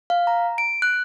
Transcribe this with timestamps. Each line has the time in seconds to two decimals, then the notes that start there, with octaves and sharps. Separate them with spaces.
0.10 F5
0.27 A#5
0.58 D7
0.82 F#6